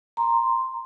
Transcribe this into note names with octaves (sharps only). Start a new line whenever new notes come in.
A#5 C6